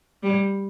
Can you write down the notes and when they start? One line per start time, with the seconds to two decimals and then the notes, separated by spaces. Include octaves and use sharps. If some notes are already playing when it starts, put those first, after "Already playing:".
0.23 G3